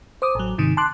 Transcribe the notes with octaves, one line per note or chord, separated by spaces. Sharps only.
C5 D6 D#6
A1 F#3
G#2 C3 D#3
A5 C6 D6 F#6